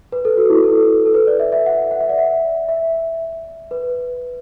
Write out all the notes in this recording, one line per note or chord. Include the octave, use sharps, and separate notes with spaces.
B4
A4
F#4
E4
A4
A4
B4
D5
E5
E5
F#5
F#5
E5
D5
E5
E5
B4